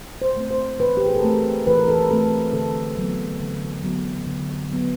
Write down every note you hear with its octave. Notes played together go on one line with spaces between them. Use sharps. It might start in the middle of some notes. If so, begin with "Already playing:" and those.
C5
A3 C4
C5
E3 B4
G4
G#4
A4
A3 C4 A#4
E3 B4
A#4
A4
A#4
A3 C4 A4
D3 A4
F#3 B3
D3
F#3 B3
D3
F#3 B3